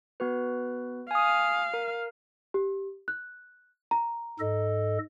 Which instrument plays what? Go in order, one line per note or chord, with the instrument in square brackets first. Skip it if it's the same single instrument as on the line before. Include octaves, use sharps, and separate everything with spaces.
[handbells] B3 F#4 B4
[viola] F5 [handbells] G#5 D#6
[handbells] A#4
[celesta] G4
F#6
A#5
[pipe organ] G#2 A4 D#5